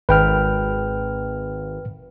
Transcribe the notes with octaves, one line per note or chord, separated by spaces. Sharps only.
G#1 B4 G5 F6